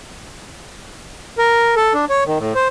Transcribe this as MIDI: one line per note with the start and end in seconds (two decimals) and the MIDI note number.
1.38 1.75 70
1.76 1.93 69
1.94 2.05 62
2.10 2.24 73
2.26 2.38 51
2.38 2.53 45
2.55 2.68 72